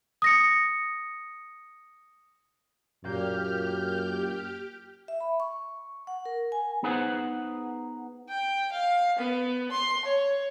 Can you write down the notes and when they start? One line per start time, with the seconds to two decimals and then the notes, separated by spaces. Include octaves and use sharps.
0.22 D#6 A#6 C#7
3.05 F#2 A#2 A#3 G4 F6 G6
5.08 E5
5.20 B5
5.40 C#6
6.07 F#5
6.26 A#4
6.52 G#5
6.83 B3 D#4 G#4 B4 C5 F#5
8.29 G5
8.72 F5
9.18 B3
9.71 C6
10.05 C#5